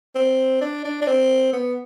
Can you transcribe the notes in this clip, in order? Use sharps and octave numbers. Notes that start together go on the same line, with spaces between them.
C4
D4
D4
D4
C4
B3